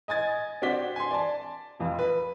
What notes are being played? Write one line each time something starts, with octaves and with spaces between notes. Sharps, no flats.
D#5 G#5 G#6 A6
C4 D4 F#4 B6 G7
G#5 C6
D5 A5
F1 F2 F4
B4